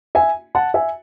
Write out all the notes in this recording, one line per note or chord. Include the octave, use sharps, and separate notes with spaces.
E5 G#5
F#5 A5
E5 G#5